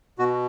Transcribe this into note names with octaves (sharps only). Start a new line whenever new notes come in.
B2 F#4